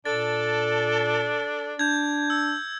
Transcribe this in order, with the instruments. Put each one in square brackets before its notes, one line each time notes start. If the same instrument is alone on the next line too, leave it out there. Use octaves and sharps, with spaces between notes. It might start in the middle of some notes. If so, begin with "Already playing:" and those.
[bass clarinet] A#2 [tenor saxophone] D4 [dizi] A4 [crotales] A6
[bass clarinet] D4 [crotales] G6 G#6
[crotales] E6